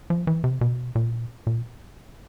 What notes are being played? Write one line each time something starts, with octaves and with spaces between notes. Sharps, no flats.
F3
E3
C3
B2
A#2
A#2